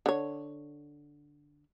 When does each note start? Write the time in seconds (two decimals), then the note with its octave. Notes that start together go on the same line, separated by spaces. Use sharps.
0.06 D3 C#5